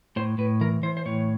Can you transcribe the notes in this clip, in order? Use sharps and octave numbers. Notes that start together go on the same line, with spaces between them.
A2 C5
A2 B4
E3 A#4
E3 C5
C5
A2 C#5